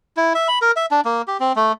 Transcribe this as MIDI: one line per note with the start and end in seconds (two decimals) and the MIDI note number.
0.17 0.33 64
0.35 0.48 76
0.48 0.59 83
0.62 0.71 70
0.76 0.86 76
0.91 1.01 62
1.05 1.22 58
1.28 1.37 67
1.40 1.52 60
1.56 1.72 57